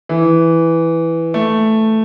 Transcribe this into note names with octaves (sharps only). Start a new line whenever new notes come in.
E3
A3